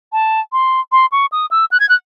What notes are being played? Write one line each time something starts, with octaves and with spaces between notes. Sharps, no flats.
A5
C6
C6
C#6
D#6
E6
F#6
G#6
F#6